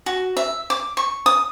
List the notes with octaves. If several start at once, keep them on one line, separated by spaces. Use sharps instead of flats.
F#4
E5
D6
C#6
D#6